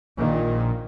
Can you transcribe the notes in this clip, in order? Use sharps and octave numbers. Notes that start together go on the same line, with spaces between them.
A#1 A#2 D#3